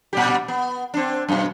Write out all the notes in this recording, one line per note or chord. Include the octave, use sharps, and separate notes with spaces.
A#2 G3 G4
B3
C4 D4
F#2 B2